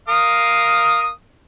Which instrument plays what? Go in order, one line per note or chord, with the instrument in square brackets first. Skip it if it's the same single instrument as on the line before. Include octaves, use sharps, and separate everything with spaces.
[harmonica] A#4 F5 D#6